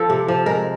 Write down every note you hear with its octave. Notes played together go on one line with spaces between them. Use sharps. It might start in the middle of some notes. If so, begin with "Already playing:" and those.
Already playing: F3 A4
C3
F3
G#3 A#4